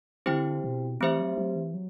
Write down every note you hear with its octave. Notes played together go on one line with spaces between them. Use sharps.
D3 C4 E4 G4 C5 G5
B2
E3 A3 C4 G4 C5 E5
F#3
F#3
E3
F#3